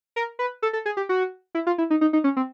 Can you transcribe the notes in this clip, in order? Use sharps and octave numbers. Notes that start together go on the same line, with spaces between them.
A#4
B4
A4
A4
G#4
G4
F#4
E4
F4
E4
D#4
D#4
D#4
C#4
C4